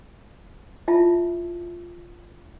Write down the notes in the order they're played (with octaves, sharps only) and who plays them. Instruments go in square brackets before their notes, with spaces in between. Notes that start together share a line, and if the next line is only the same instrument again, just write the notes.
[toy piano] E4 F4 E5 A5